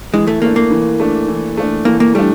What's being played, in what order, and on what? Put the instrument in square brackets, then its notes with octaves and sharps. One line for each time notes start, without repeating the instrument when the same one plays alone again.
[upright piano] E3 [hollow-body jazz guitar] G#3
[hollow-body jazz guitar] A3
[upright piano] A3 D4 [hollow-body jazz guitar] A#3
[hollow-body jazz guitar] A#3
[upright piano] E3
A3 D4
E3
A3 D4
[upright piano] E3 [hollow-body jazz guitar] A#3
[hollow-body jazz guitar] A#3
[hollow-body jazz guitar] G3 [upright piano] A3 D4